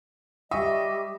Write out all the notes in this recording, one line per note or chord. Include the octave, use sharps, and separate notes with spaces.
G3 D#5 E5 C#6 D#6